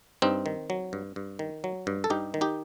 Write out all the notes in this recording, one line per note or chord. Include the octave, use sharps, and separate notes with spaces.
G2 C4 D#4
D#3
F#3
G2
G2
D#3
F#3
G2
A4
G2 D#4 G4
D#3
D#4 G4